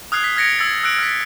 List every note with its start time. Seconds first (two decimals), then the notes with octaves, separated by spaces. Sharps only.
0.12 D#6 F6 F#6 G#6 C7
0.24 B6
0.36 F6 G#6 A#6 C#7 D7
0.59 E6 G#6 A6
0.83 E6 F#6 D7
0.99 F6 B6